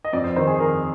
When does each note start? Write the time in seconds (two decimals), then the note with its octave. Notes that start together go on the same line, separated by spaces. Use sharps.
0.05 D#5
0.13 F2 D5
0.24 C5
0.36 D#3 C5
0.47 G#4
0.60 D#3 A#4